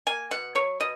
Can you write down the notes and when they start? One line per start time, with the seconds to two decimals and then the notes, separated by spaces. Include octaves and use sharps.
0.07 A#3 G#5
0.31 B2 F#5
0.55 F#3 C#5
0.80 B2 D#5